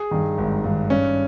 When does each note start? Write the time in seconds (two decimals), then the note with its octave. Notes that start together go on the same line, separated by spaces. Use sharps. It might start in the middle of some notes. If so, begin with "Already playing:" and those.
Already playing: G#4
0.11 G2 D#3
0.38 G#1
0.64 G2 D#3
0.90 G2 C#4